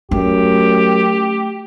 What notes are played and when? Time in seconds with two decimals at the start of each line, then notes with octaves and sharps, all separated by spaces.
0.11 F#2 A3 G4